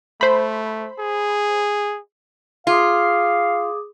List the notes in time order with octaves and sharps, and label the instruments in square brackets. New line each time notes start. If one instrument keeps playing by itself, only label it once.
[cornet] A3 [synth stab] C5 B5
[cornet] G#4
[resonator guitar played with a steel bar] F4 [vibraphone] G#4 D6 D#6 [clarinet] F5